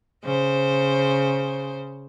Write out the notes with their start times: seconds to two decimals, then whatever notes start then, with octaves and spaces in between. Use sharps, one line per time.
0.24 C#3 C5